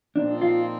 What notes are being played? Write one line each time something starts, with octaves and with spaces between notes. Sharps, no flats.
A#2 F3 C4 D4 D#4
F4